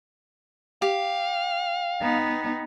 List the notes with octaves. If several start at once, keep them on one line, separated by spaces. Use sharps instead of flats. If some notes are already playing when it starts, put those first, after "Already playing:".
G4 F5
B3 D#4